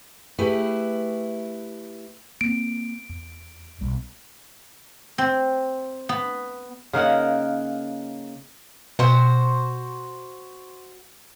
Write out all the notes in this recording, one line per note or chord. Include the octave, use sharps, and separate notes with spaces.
A3 E4 G4 G#4 B4
A#3 C4 D7
E2
B1 G3
C4
B3
C#3 A#3 D#4 F#5
B2 F#4 C5